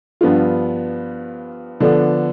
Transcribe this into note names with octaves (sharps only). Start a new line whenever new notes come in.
G2 F3 B3 F4
D3 F3 B3 D4